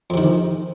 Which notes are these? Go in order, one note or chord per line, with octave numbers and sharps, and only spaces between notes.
F2 C3 D#3